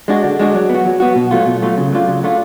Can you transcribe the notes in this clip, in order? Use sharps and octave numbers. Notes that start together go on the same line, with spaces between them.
G#3 D4 F#4
D3
G#3 D4 F#4
F#3
B3
F#4
F#3
B3 F#4
B2
F#3 A3 F4
B2
F#3 A3 F4
C#3
F#3 A3 D4 F4
C#3
F#3 A3 D4 F4